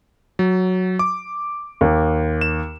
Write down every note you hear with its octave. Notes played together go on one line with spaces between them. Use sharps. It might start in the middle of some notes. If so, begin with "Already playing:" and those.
F#3
D6
D#2
E7